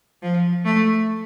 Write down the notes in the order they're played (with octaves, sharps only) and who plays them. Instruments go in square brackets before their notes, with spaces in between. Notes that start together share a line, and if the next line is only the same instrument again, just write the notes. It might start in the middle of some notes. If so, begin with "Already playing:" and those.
[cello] F3
A3